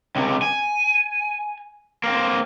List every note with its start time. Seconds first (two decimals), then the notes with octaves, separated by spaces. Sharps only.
0.16 C#2 C3
0.42 G#5
2.04 A#3 C4